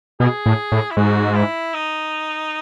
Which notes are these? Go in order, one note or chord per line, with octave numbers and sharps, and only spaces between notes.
B2 G#4
A2
A2
E4
G#2 F#4
E4
D#4